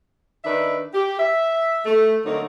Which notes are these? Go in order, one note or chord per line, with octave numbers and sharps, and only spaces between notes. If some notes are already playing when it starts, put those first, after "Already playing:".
D#3 D4 D#4 B4 E5
G4
E5
A3
D3 F#3 A3 A#3 C4 D#4